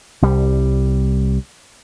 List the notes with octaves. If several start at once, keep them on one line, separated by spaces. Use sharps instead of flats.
C2 G3